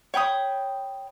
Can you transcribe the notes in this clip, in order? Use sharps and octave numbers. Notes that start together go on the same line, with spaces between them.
C#5 G5 B5 D#6